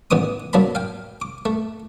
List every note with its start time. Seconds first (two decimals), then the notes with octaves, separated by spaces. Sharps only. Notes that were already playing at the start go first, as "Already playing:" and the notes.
0.11 A1 E3 B3 D6 D#6
0.53 F#2 F#3 A#3 A5 B5
0.75 F5 G5
1.22 D6
1.45 A3